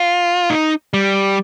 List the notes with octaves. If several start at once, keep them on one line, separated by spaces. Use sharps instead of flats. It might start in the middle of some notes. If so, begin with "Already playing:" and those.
Already playing: F4
D#4
G3